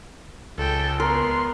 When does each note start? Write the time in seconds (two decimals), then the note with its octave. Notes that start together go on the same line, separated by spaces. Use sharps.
0.58 C#2 A4 G5
1.00 B3 A#4 C6